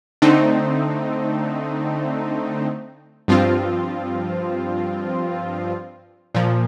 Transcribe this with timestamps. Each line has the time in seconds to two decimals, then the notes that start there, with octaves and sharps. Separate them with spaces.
0.22 D3 A3 C4 D#4
3.28 G2 F3 C4 F4
6.35 A#2 F3